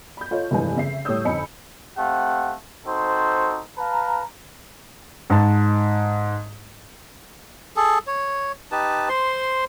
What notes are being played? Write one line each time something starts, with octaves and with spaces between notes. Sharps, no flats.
B5 G6
F4 A4 C#5 D#5
F1 G2 E3 G#3 B4 G#5
C#3 E5 C7
A2 G3 C#5 D#6 E6 G6
F2 D3 D#4 G#5 B5 C#7
A3 C4 G4 F5 F#5
C4 D#4 F#4 A4 C5
B4 F5 A5 A#5
G#2 A5
G#4 A4
C#5
D#4 G4 B4 A5
C5 C6